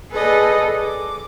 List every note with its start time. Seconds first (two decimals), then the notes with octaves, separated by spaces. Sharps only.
0.11 G#4 A4 B4 D5 D#5
0.80 D6